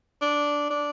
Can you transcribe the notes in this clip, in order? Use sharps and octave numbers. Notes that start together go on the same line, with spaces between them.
D4
D4